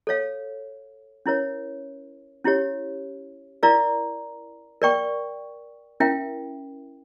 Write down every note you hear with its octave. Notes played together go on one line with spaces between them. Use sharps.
A4 C#5 F5
C#4 E4 A#4 C#5
C#4 E4 G4 C#5
E4 A#4 D5 F5 A#5
A#4 D5 G5 C#6
C#4 E4 A#4 E5 G5